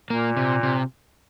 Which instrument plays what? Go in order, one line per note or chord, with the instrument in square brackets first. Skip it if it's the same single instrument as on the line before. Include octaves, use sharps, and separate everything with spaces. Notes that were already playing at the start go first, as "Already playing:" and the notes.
[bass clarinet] A#2 [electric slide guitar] A#3
[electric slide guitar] C3
C3